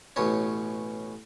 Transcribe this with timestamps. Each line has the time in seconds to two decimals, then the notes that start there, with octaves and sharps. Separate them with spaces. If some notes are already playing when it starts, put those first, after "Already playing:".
0.16 A1 B2 C#4